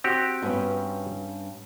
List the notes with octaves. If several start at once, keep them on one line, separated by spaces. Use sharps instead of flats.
C4 F#4 G4
G2 B3 C#4